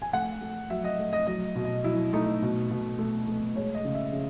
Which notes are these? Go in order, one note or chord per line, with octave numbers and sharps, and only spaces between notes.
G#5
A3 F#5
A3
F#3 E5
D#5
A3
D#5
F#3 D#5
B2
D#5
F#3 E4
A3 D#4
B2
B2
A3
A3
G#3 C#5
D#5
C#3
E5
C#3